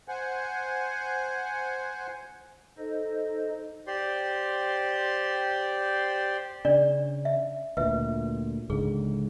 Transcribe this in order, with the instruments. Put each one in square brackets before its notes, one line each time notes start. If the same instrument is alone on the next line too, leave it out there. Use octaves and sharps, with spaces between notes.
[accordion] C5 F#5 G#5
[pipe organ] D#4 A4 C5 D#5
[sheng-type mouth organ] G4 C5 D5 C6
[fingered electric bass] C#3 [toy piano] D4 D5
[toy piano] E5
[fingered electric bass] D2 A#2 [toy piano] B4 E5
[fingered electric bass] C#2 G#2 D3 [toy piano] G#4